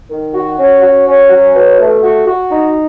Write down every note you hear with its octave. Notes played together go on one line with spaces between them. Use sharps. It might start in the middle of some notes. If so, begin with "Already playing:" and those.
D#3
F#4
C#4
F#4
C#4
F#3
B2
A3
F#4
F#4
D#4